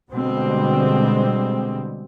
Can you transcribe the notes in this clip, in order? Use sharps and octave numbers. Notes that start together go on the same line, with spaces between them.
B2 D3 G3 G#3 C4